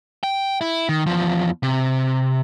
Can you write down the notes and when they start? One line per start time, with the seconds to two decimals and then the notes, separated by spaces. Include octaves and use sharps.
0.23 G5
0.61 E4
0.89 D#3
1.06 E2 F3
1.63 C3